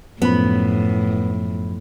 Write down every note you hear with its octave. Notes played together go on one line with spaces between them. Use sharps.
F#2 A2 F3 B3 B5